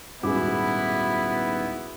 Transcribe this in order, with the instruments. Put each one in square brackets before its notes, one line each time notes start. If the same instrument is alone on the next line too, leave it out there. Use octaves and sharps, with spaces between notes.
[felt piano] D#1 G#2 D6 [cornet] B3 [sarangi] E4 [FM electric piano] F#4 G#4